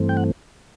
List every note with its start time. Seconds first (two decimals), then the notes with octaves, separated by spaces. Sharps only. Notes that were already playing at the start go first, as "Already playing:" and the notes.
Already playing: G2 E3 A3 C4
0.09 G5
0.17 F#5